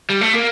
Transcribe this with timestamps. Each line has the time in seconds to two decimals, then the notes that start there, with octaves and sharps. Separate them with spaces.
0.10 G3
0.21 A3
0.33 A#3